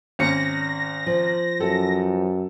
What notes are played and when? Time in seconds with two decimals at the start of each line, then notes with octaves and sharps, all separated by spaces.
0.19 G#1 C#4 A#6 C#7
1.07 F3
1.60 F#2 A4